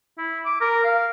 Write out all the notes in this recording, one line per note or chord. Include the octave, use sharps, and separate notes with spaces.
E4
D6
A#4
F5